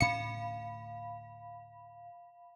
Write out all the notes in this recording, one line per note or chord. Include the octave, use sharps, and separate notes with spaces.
D2 A2 C#4 F5 B5 C#7